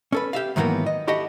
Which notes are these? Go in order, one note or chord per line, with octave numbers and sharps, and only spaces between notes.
C#4 A4 B4
G4 E5 F5
G#2 D#3 E3 F#3 A#3 B3
D#5
E4 F#4 G4 A4 D#5 F#5